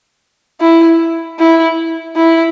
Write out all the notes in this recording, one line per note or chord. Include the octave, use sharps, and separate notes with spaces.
E4
E4
E4